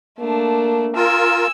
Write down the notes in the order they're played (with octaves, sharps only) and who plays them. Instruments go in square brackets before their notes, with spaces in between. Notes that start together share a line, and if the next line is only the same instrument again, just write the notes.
[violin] A3 D4 [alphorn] A#3
[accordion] F4 A#4 [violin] G#5 E6